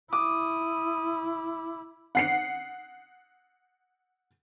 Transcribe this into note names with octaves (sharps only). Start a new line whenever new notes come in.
E4 D6 D#6
F#5 C7 C#7